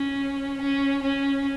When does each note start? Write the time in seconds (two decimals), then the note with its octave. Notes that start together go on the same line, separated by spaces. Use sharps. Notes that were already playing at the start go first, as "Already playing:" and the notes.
Already playing: C#4
0.61 C#4
1.03 C#4